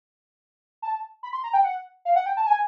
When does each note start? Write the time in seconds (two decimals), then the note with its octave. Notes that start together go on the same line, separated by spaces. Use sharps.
0.82 A5
1.23 B5
1.33 C6
1.44 A#5
1.53 G5
1.64 F#5
2.05 F5
2.16 F#5
2.26 G5
2.37 A5
2.47 G#5